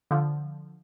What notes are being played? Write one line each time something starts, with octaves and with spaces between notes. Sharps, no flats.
D3 F3